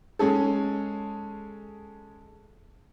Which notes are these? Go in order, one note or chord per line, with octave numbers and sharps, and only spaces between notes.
G#3 C#4 G#4 A4